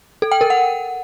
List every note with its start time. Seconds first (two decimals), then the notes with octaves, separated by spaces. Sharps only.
0.22 A4
0.32 G5
0.41 A#4
0.50 F#5